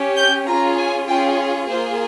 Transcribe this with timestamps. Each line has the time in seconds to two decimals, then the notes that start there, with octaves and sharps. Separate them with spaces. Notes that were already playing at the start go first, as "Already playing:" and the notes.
Already playing: C#4 G4
0.17 G6
0.47 C#4 F4 G#4 A#5
0.77 G#5
1.08 C#4 F4 G#4 G5
1.69 A#3 F4 G#4 C5